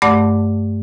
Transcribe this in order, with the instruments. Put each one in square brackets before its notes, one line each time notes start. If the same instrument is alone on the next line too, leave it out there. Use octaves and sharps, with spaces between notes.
[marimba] G2 A3 D5 F#5 A5 D6